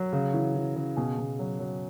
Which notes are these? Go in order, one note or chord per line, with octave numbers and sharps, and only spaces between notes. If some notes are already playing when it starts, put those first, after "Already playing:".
Already playing: F#3
C#3
E3
E3
C#3
B2 G#4
B2
F#3
F#3